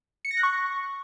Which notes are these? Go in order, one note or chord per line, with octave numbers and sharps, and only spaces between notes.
C#7
A#6
F#6
C#6